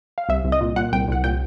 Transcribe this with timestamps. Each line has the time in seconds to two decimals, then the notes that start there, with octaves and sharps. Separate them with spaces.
0.18 F5
0.29 C2 E5
0.44 C2
0.52 D#5
0.61 A#2
0.76 A#2 F#5
0.92 C2 G5
1.09 C2 F#5
1.24 A#2 G5